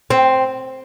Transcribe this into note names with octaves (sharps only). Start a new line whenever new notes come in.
C4